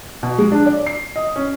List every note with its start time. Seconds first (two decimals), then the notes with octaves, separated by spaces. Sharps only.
0.23 B2
0.38 G#3
0.52 D4
0.66 D5
0.87 C7
1.16 D#5
1.36 C#4